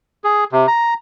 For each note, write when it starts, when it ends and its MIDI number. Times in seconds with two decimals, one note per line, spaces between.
0.24 0.44 68
0.52 0.67 48
0.68 0.94 82